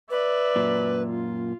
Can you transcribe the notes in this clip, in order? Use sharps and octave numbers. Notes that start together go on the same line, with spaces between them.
B4 D5 E5
F#2 A#2
F4